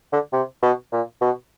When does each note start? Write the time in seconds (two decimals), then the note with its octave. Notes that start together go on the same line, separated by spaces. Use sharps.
0.12 D3
0.33 C3
0.62 B2
0.92 A#2
1.21 B2